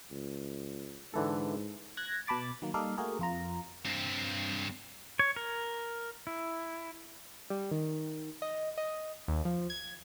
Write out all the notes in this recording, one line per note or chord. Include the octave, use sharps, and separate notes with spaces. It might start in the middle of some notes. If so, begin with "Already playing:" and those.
C#2
G#2 D3 E3 A4
F#6 G#6 A#6
B2 A5 B5 D6 A6
D#3 F#3 A#3
G3 A#3 D#4 A4 D5 F5
A3 A#3 F#4 G#4 A#4
F2 F4 A#5
G2 C4
C#5
A#4
E4
G3
D#3
D#5
D#5
D#2
F3
G#6